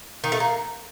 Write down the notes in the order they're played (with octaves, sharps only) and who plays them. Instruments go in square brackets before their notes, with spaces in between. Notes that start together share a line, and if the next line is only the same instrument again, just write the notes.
[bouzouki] D#3
A3
A#3